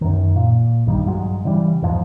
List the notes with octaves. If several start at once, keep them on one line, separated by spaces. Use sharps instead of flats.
F#2 D#3
A#2
A#1 G2 D#3 G3
G2 F#3 G#3
C#3 E3 G3
E2 G#2 F3